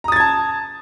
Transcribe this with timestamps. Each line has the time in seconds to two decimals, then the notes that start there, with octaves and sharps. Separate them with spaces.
0.04 A#5
0.08 D#6
0.12 A6
0.16 G#6
0.20 A5